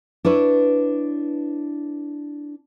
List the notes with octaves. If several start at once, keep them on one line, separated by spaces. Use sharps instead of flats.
D4 E4 B4 C#5